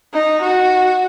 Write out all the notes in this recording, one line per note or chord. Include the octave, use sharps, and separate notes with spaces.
D#4
F#4